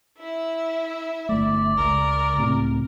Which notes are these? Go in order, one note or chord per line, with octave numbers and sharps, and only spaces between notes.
E4 E5
G1 A3 D5
C#2 A#4
C#2 A2 C3